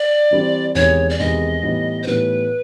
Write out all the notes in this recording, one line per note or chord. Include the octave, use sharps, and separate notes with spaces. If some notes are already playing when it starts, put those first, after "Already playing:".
Already playing: D5
E3 G3 C4
E2 C3 D#3 G#3 C#5
D5
E2 C3 D#3 G#3 D#5
A2 E3 G3 B3 D#4
C5
A2 E3 G3 B3 D#4 B4